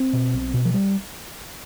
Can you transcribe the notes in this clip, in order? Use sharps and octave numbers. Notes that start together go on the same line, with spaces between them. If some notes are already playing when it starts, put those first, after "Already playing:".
Already playing: C4
B2
B1
B2
F3
G3